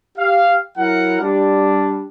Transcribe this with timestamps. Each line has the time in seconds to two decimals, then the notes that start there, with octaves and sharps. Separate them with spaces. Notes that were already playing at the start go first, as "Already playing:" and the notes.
0.18 G4 F5
0.78 F#3 E4 A#4 F#5
1.21 G3 D4